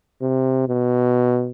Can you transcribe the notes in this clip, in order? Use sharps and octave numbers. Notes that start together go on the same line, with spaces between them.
C3
B2